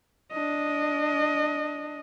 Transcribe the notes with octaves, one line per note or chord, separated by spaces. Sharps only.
D4 D#5